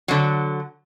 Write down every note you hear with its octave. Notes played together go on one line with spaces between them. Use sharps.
D3 F#3